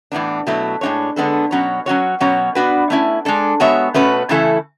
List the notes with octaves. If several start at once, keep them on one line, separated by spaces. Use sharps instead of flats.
A2 E3 B3 D4
B2 F#3 A3 E4
A2 G#3 D4 F#4 C#5
D3 G#3 B3 D4 A4
B2 F#3 C#4 F#4 C#5
F#3 C#4 F#4 C#5
B2 F#3 C#4 F#4 C#5
B3 D4 F#4 B4
A3 C#4 E4
G#3 D4 A4
G#3 B3 F#4 C#5 E5
B2 A3 C#4 F#4 B4
C#3 E3 A3 E4 A4